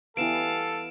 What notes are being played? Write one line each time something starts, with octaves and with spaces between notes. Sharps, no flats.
E3 G3 B3 A4 F5 D7 E7